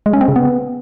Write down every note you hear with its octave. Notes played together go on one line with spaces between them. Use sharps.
G#3
C#4
C4
C#3
B3